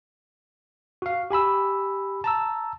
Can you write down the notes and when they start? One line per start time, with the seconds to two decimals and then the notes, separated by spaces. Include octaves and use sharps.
1.02 F#4 F5
1.31 G4 G#5 B5 E6
2.24 A5 A#5 E6